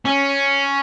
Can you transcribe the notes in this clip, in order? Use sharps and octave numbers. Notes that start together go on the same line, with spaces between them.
C#4